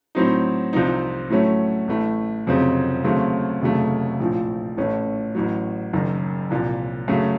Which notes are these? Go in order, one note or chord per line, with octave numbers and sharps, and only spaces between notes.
A2 F#3 C4 D#4
C2 C3 F3 C4 D#4
A2 F#3 A3 C#4
A1 A2 A3
F1 F2 C#3 F#3 C4
D#2 C#3 F#3 A3 C4
F1 D#2 C#3 F#3 A3
A#1 A2 F3
A1 A2 A3 C#4
A1 A2 F#3
F#1 F#2 D#3
C2 A#2 F3
F#2 C#3 F#3 A3